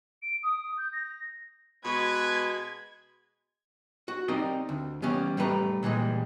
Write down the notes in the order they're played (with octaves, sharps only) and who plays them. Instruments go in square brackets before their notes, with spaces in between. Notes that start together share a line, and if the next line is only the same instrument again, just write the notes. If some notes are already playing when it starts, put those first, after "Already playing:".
[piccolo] D7
D#6
G6
A#6
[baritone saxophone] B2 [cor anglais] G#3 [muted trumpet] B4 [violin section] G#6
[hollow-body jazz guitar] F#4
C4 D#4 G4 A#4 D5 D#5
D2
E3 G3 B3 C#4
A2 G3 A3 B4 A#5
A#2 E3 G3 G#3